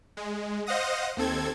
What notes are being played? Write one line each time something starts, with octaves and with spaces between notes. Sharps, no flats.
G#3
C5 D#5 F5 F#5 D#6 A#6
D#2 C4 A4 G#6